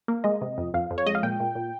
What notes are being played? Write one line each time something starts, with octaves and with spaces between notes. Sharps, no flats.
A#3
G#3 D#5
C3
F2
F2 F5
F2
C#5
G#3 D#5
F5
A#2 G5
A#2
A#2